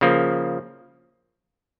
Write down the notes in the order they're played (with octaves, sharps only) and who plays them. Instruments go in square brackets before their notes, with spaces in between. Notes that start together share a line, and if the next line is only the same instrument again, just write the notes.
[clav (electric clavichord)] C#3 F3 A#3